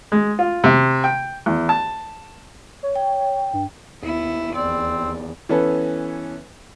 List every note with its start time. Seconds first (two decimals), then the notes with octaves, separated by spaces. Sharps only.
0.12 G#3
0.39 F4
0.64 C3
1.04 G5
1.46 E2
1.69 A5
2.83 C#5
2.96 G5
3.53 G2
4.03 D#2 B3 E4
4.55 E2 C4 D5
5.49 E3 B3 C#4 A4 B4